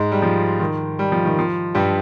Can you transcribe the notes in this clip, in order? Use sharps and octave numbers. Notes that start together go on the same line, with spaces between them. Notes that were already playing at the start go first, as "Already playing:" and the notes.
Already playing: G#2 G#3
G3
F3
D#3
G3
F3
D#3
F3
G2 G3